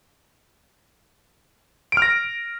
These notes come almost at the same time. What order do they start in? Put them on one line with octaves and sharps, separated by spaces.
D7 F6 A#6